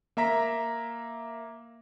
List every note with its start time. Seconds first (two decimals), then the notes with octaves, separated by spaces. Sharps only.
0.17 A#3 E5 A#5 B6